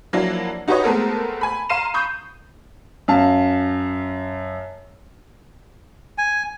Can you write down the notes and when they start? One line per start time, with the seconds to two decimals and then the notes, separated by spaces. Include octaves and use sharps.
0.13 F3 F#3 A#3 D4 E4
0.68 D#4 F#4 G4 B4 C#5 D#5
0.84 G#3 A3 B3 C4 A4 A#4
1.41 G#5 B5
1.69 F5 A#5 C6 C7 D#7 E7
1.94 B5 C#6 D#6 G6
3.08 F#2 F5 A5
6.18 G#5